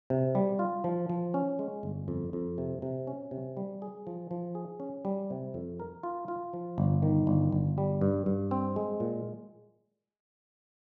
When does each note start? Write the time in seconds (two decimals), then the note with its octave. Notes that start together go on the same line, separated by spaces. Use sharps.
0.10 C3
0.35 G3
0.59 F4
0.84 F3
1.09 F3
1.34 C#4
1.59 G#3
1.83 G1
2.08 F2
2.33 F2
2.58 C3
2.82 C3
3.07 C#4
3.31 C3
3.57 G3
3.82 G#4
4.07 F3
4.31 F3
4.55 G#4
4.80 C#4
5.05 G3
5.30 C3
5.54 F2
5.80 A#4
6.03 F4
6.28 F4
6.53 F3
6.78 G1
7.03 D#3
7.27 G1
7.52 G1
7.78 G3
8.01 G2
8.26 G2
8.51 C4
8.76 G#3
9.00 A#2